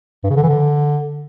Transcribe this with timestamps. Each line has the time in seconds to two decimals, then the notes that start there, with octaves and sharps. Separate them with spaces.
0.24 G2
0.30 C#3
0.36 D3
0.43 E3
0.49 D3